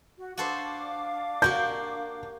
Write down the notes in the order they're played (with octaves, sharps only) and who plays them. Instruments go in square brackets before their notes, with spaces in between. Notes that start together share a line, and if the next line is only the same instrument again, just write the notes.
[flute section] F#4
[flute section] D4 F5 D6 [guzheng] F#4 A4 C5
[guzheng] A#3 F#4 G4 [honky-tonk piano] G6